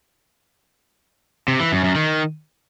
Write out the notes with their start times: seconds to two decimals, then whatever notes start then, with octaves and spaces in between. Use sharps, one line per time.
1.48 C3
1.60 E3
1.72 F#2
1.84 F#2
1.96 D#3